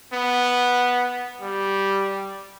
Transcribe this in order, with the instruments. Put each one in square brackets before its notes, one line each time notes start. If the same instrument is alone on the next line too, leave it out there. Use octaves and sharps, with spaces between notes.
[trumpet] B3
G3